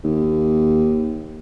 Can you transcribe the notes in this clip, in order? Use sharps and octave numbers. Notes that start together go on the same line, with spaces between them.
D#2